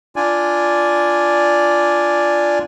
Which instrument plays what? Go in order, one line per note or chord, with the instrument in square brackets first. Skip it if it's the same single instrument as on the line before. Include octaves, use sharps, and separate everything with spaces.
[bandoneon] D4 F4 D5 G#5